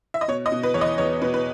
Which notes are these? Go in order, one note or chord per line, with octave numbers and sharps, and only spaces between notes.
E5
D#5
B2 C#5
D#5
B2
B4
E2 C#5
D#5
E2 C#5
B2 B4
B4